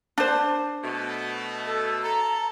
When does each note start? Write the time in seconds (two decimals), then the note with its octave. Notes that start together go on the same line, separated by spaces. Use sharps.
0.18 D4 C5
0.83 B2 A3
1.66 A4
2.03 A4 A#5